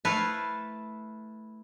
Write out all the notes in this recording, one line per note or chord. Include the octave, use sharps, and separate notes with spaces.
A3 E4 A4 B4 F5